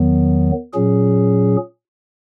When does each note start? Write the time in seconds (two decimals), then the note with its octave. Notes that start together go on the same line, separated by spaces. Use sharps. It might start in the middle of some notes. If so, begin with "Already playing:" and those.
Already playing: E2 D#3 F#3 B3
0.73 A#2 F#3 C#4 G#4